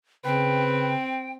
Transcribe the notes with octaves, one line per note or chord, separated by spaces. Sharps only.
C#3 C4 B4 G5